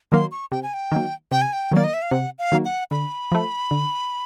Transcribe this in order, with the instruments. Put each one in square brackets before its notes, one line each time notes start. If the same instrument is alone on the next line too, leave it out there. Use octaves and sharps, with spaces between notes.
[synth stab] D#3 F#3 A#3 [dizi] C6
[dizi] C#6
[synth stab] C3 [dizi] G5
[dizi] G#5
G5
[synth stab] D#3 F#3 A#3
[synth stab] C3 [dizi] G5
[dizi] G#5
G5
[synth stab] D#3 F#3 A#3 [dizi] D5
[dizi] D#5
E5
F5
[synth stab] C3 [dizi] F#5
[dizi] F5
[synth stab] D#3 F#3 A#3
[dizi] F#5
[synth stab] D3 [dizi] B5
[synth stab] F3 A3
D3